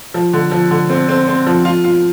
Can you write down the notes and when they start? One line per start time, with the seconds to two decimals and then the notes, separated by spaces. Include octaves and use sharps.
0.14 F3
0.33 D3
0.51 F3
0.71 D3
0.90 C4
1.09 C4
1.28 C4
1.46 F3
1.65 F4
1.84 F4